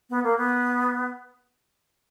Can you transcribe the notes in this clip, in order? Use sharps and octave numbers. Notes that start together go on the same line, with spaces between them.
B3
A#3
B3